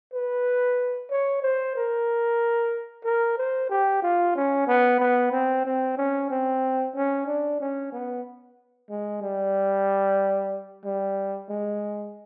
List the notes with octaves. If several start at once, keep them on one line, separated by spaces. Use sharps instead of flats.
B4
C#5
C5
A#4
A#4
C5
G4
F4
C#4
B3
B3
C4
C4
C#4
C4
C#4
D4
C#4
B3
G#3
G3
G3
G#3